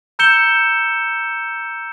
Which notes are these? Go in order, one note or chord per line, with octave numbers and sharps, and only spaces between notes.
A#5 E6 G6 C#7 E7 G7